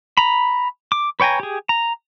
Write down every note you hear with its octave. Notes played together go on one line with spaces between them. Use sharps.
A#5 B5
D6
B4 C#5 G5 G#5 A#5
G4 G#4
A#5